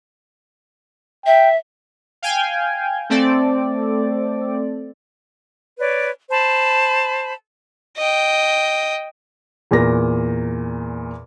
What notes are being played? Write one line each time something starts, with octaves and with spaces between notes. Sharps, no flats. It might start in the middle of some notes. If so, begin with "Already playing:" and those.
E5 G5
F5 G5 G#5
A3 C4 A4 D5
B4 C#5 D5
C5 A5 B5
D#5 G5
E2 A#2 A#4 A#6